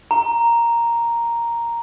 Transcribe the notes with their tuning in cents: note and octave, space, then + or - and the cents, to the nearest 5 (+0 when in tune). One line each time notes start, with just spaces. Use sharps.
A#5 +0